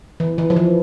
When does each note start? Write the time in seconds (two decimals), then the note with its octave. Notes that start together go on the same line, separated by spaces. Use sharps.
0.20 E3
0.38 E3
0.50 F3
0.56 E3